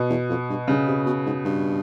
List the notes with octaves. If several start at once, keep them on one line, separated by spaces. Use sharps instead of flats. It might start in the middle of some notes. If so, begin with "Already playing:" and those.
Already playing: B2
E2
F2
G2
G2 C#3
C3
B2
G#2
G2